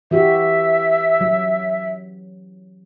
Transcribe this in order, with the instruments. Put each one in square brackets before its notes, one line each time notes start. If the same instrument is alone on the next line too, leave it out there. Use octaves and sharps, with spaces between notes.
[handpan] E3 F#4 G4 [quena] E5
[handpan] F#3